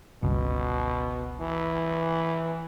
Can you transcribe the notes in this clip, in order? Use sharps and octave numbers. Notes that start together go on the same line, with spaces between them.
G1 C#2 B2
E3